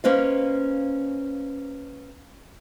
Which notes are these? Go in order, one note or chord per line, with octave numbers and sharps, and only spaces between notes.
A#3 C#4 B4 C5 D#5 F5